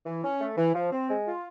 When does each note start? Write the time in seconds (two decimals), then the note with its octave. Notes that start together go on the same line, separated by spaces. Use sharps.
0.06 E3
0.23 C#4
0.40 A3
0.58 E3
0.75 F3
0.92 C4
1.10 G#3
1.26 F4